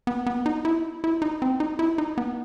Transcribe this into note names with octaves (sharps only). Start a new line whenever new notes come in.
B3
B3
D#4
E4
E4
D#4
C4
D#4
E4
D#4
B3